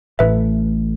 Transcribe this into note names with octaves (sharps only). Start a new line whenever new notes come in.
A1 A2 A3 B4 E5